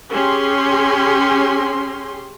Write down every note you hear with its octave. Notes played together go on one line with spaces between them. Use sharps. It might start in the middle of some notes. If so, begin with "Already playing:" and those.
C#4 G4 G#4 C6